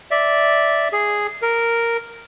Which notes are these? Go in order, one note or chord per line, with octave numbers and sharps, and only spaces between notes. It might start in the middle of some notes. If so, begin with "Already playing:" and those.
D5 E5
G#4
A#4